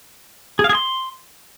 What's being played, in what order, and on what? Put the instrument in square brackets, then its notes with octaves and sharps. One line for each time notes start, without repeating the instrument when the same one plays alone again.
[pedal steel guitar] G#4
F5
G#4
C6